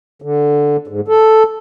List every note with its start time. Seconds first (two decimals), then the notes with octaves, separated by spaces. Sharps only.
0.22 D3
0.87 G#2
1.08 A4